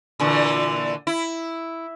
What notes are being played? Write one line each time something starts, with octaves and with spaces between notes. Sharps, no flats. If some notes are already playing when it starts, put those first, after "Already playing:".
A#2 D3 E3
E4